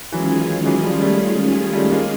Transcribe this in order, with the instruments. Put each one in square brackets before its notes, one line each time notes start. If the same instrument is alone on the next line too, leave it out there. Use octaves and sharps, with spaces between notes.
[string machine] D#3 G#3 C#4 F4 G#4 [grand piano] E3 F#3
[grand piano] E3 F#3
F3 G3
G3 A3
G3 A3
G#3 A#3